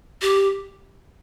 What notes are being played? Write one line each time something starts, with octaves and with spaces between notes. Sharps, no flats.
G4